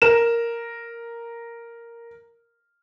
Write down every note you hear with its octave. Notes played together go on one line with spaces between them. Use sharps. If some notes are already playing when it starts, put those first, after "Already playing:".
A#4 E7